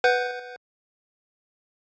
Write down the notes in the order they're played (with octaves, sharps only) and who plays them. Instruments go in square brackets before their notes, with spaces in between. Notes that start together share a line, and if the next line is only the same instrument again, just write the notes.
[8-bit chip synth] B4 F#5 G6